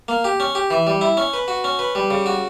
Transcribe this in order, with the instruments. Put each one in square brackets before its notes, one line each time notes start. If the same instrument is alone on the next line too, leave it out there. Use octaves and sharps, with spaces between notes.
[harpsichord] A#3
G4
C#4
G4
E3
G3
E4
C#4
B4
F#4
C#4
B4
G3
C#3
F#4